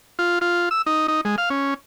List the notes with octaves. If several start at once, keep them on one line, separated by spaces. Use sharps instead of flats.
F4
F4
E6
D#4
D#4
G#3
F5
C#4